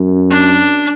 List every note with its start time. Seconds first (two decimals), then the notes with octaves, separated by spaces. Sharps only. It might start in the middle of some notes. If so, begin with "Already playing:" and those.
Already playing: F#2
0.30 D4